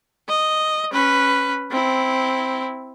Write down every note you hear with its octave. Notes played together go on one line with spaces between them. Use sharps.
D#5
C#4 B4
C4 E4